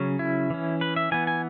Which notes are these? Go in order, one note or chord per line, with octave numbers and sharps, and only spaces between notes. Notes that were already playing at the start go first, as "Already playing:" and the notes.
Already playing: C#3 F#3 C#4
E4
E3 C#4
B4
E5
E3 B3 G#5
G#5